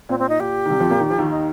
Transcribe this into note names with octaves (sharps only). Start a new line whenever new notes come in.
A#2 C4
C4
D#4
A#2 G4
D#3
C2 C3
F2 F3
A#2 A#3
D#3
F3
D#2 D#3
D#4